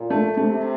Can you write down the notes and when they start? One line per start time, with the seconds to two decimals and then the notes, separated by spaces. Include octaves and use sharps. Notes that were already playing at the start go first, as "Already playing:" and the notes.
Already playing: A#2
0.10 A3
0.37 C3 A3